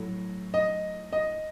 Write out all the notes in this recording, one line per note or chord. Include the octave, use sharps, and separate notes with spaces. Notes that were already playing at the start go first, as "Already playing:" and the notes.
Already playing: A2 F#3 A3
D#5
D#5